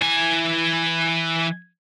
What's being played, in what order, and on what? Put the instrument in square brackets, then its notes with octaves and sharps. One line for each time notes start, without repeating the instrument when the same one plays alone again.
[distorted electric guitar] E3 G#5